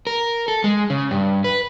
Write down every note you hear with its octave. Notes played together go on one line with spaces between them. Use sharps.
A#4
A4
G#3
C#3
G2
B4